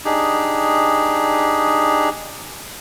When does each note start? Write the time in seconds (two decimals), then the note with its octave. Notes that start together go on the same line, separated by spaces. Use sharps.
0.05 D4 D#4 G4 G#4